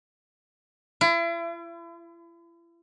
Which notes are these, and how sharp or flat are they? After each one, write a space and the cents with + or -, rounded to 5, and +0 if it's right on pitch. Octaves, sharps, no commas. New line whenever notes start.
E4 +40